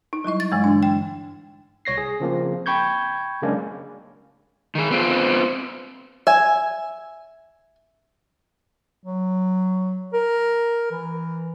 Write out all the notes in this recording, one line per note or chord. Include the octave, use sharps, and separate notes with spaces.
D#4
F#3 G3 E4 D#5
A6
G2 E3 G#3
D3 D4
G5
C2 C#5 A#6 C7
G#4
C#3 F3 A#3 C4
G5 B5 C#6 G6 G#6
C#3 F#3 G#3 A#3 C#4 D4
D#3 G#4
B3 C4 F4
E5 G#5
F#3
A#4
E3